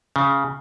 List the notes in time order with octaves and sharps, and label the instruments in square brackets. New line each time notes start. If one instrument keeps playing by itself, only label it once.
[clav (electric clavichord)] C#3